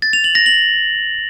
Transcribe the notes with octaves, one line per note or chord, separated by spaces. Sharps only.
A6
F7
F#7
A#6
F#7